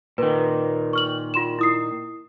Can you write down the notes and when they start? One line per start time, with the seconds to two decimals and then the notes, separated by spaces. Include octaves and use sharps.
0.18 A#2 D#3 B4
0.93 C#6 F6 F#7
1.34 F4 C6 E7
1.59 E4 D#6 C7